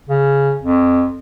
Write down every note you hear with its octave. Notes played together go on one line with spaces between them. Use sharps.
C#3
F2